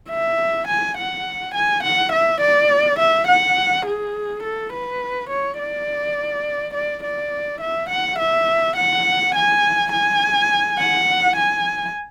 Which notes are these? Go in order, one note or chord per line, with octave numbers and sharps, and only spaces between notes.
E5
G#5
F#5
G#5
F#5
E5
D5
E5
F#5
G#4
A4
B4
C#5
D5
D5
D5
E5
F#5
E5
F#5
G#5
G#5
F#5
G#5